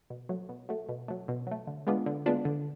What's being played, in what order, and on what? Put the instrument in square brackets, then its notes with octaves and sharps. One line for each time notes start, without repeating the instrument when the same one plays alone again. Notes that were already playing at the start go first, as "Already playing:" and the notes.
[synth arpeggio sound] B2
F#3 A3
B2
F#3 A3
B2
F#3 A3
B2
F#3 A3
D3
G#3 B3 D4 F4
D3
G#3 B3 D4 F4
D3